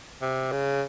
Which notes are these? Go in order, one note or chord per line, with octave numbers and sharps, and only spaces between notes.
C3
C#3